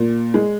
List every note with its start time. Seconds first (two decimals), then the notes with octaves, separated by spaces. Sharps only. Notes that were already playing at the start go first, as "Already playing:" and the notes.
Already playing: A#2
0.34 G#3